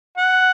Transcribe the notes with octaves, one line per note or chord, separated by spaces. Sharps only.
F#5